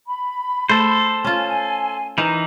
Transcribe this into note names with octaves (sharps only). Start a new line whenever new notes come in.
B5
A3 A4 C5
C#4 F4 G#5
E3 D#4 A#4